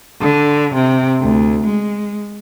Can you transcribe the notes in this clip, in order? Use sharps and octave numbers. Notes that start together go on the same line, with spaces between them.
D3
C3
D2
G#3